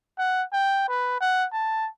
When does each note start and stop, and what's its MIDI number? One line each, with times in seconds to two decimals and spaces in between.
0.18 0.43 78
0.52 0.84 79
0.88 1.20 71
1.20 1.46 78
1.53 1.88 81